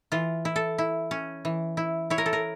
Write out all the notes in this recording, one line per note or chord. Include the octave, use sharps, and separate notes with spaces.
E3 F4
E4
A4
E4
C#4
E3
E4
E4 C#5
A#4
A4
A#4